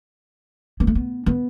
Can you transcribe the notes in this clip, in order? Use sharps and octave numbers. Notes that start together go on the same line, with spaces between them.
B3
A3
B3
B3